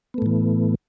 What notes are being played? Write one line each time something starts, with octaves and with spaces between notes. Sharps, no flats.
A2 E3 A3 B3